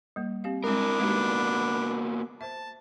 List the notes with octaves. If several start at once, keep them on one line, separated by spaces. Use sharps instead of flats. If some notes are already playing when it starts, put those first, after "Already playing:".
G3 A#3
C4 G4 F5
G#3 C4 D4 E4 A#4 B5
G#3 A#3 B3 D#4 F#4 G4
C5 E5 A5